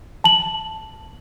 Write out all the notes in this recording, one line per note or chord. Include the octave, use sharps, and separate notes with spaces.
A5 F#7